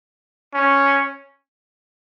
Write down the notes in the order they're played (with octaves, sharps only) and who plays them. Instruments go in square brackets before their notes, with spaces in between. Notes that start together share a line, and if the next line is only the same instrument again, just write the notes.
[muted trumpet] C#4